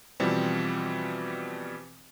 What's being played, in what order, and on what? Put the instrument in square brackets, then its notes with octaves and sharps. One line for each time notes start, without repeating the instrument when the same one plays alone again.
[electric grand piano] B2 E3 F3 G3 C4